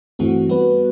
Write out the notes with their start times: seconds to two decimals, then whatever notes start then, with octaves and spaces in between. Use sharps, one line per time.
0.19 G2 E3 A3 C4 F#4
0.49 G3 B3 F#4 B4